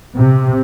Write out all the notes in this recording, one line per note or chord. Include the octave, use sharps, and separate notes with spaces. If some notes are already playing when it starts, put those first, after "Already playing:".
C3